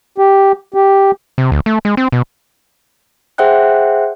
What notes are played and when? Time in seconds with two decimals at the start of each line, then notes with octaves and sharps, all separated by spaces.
0.18 G4
0.74 G4
1.38 C3
1.52 D2
1.66 A3
1.85 G#3
1.97 C4
2.12 B2
3.38 G#4 C5 E5 F#5 G5 F#6